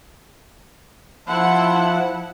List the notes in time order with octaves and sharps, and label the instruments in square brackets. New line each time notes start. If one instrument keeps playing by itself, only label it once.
[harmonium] F3 [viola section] E4 F#5 [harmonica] E5 A5 C6